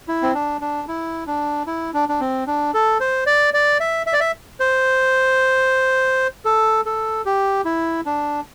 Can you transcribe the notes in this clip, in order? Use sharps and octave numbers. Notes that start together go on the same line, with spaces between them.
E4
C4
D4
D4
E4
D4
E4
D4
D4
C4
D4
A4
C5
D5
D5
E5
E5
D5
E5
C5
A4
A4
G4
E4
D4